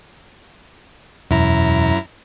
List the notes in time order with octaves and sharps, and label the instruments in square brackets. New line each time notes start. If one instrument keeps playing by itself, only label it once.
[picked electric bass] E1 [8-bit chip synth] F#2 E4 A#5